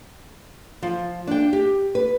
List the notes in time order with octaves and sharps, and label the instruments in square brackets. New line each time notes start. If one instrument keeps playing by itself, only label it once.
[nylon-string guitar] F3
D4 G5
G4
B4